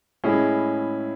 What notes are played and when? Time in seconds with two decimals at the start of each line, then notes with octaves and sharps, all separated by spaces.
0.24 A2 G#3 C#4 E4 G#4